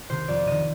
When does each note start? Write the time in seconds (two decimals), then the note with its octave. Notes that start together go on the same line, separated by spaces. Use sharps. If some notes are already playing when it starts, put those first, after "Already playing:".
0.09 C3 D#3 C5
0.28 F2 D5
0.47 C3 D#3 D#5